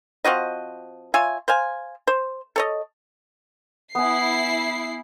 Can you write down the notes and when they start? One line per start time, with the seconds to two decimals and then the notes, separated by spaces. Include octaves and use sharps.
0.24 F3 C4 F#4 D#5
1.14 F4 C#5 E5 G#5
1.48 C5 F5 G#5
2.07 C5
2.56 A4 C#5 D#5
3.95 B3 E4 G#5 C7